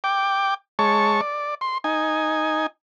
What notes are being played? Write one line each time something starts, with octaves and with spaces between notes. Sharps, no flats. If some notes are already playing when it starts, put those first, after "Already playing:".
G5 D6
G#3 C#5 A5 C#6
D5
C6
D#4 G#5